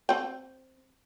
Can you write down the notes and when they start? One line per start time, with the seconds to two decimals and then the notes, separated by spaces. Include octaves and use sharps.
0.09 C4 G5